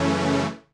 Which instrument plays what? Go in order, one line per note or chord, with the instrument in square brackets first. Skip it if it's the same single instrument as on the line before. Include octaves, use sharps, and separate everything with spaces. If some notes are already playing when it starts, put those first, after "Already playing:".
Already playing: [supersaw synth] F#2 C#3 E3 A3 C#4